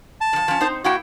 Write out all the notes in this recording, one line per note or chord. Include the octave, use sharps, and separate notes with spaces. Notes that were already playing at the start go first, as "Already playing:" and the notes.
A5
D#3 F3
F3 C#4
C4 D#4 C5
A#3 E4 F#4 G5